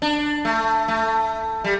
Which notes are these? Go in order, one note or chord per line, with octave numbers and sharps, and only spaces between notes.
D4
A3
A3
G3